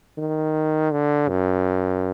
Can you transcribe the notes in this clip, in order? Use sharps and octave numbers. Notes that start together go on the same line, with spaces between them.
D#3
D3
F#2